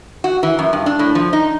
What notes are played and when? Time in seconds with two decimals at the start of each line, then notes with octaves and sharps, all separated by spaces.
0.24 F#4
0.43 E3
0.59 F#2
0.73 G2
0.86 D4
0.99 A2
1.15 F3
1.33 D#4